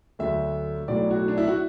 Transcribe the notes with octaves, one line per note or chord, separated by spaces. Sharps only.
D2 D3 F#3 E5
B1 A2 F#3 D5
F#4
D4
E4
F#4